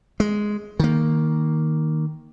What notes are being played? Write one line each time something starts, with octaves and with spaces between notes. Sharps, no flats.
G#3
D#3 A#3